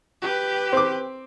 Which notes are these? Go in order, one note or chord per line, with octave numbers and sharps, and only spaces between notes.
G4 B4
C4 D6